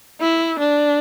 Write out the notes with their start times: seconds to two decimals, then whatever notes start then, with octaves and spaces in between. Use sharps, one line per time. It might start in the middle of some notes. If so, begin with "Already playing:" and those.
0.21 E4
0.59 D4